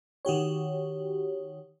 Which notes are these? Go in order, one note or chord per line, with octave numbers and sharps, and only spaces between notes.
D#3 F#4 G4 C#5